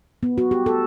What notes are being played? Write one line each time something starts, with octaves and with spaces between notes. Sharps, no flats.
B3
F#4
G4
A4